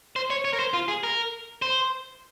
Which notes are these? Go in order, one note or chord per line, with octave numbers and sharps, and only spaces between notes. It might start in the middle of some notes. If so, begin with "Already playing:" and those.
C5
C#5
C#5
A#4
C5
F4
G#4
A#4
C5